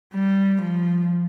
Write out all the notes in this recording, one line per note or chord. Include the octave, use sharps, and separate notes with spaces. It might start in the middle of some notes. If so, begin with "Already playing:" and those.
G3
F3